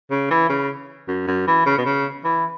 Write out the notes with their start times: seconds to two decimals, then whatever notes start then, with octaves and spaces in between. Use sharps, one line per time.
0.11 C#3
0.31 E3
0.49 C#3
1.08 F#2
1.28 F#2
1.47 E3
1.66 C#3
1.78 B2
1.86 C#3
2.25 E3